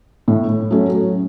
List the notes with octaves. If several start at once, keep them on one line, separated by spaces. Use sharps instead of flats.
A2
F#3 A3 C#4